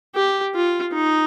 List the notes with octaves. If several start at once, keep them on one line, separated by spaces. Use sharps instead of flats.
G4
F4
D#4